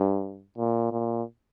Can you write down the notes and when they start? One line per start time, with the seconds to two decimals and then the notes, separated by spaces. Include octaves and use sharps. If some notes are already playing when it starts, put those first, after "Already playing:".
Already playing: G2
0.58 A#2
0.92 A#2